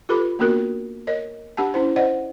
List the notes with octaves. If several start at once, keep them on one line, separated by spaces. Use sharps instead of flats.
F4 G4 A4 B4 B5 D6
A#3 B3 D4 F#4 A#4
A#4 C#5 D#5
D4 G4 F#5 A5
C#4 E4 C5
C5 D5 D#5 F#5